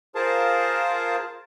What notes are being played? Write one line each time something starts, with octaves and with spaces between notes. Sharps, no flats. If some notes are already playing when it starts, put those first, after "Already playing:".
F4 G#4 A#4 C5 A5